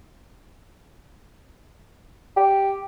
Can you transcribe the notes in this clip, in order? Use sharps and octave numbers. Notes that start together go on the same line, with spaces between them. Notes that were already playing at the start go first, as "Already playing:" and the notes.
G4